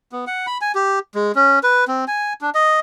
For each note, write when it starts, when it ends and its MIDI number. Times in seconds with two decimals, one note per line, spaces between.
0.12 0.25 59
0.27 0.46 78
0.47 0.58 83
0.61 0.72 80
0.75 0.99 67
1.15 1.32 56
1.35 1.59 61
1.63 1.85 71
1.88 2.05 60
2.08 2.33 80
2.41 2.50 62
2.55 2.80 75